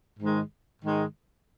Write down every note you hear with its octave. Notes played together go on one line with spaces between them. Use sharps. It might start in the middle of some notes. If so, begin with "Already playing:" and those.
G#2 D#3 G#3
G#2 D#3 G#3